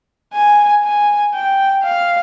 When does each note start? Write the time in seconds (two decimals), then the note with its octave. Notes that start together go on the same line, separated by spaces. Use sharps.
0.33 G#5
0.84 G#5
1.34 G5
1.84 F5